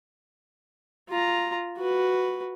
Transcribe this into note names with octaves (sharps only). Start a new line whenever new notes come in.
F4 A#5
F#4 B4